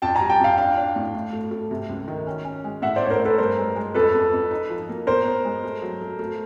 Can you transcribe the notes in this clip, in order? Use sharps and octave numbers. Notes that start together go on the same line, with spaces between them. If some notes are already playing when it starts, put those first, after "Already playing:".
F2 G5 A5
G#5 A#5
G3
G5 A5
F2 F5 G5
D4 F5 G5
D4
A2
A2
A3
A3
C3
C#2
D#3
C#4
C#4
G#3
A2 E5 F#5
C5 D5
A2 C#5
A#4 C5
A2
A4 B4
G2 A#4 C5
G#3
G#3
F2 A4 B4
F2
F2
D#4
F3
A#3
B3 A#4 C5
B3
G#3
A3
F#3
A3
A3